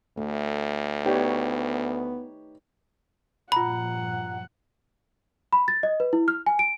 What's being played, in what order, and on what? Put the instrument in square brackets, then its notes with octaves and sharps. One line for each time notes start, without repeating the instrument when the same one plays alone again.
[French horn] D2 [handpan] A3
[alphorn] B3 [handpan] D#4 B4 C#5 [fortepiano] G4 D5
[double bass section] G2 A#2 F3 [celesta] F4 A#5 [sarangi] F#5 [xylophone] B5
[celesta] B5
A6
D#5
B4
E4
F6
G#5
D7